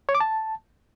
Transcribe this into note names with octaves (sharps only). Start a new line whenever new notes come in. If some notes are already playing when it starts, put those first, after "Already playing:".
C#5
D6
A5